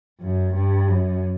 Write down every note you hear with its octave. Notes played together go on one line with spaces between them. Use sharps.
F#2
G2
F#2